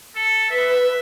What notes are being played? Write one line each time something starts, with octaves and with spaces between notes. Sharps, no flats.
A4
B4 E5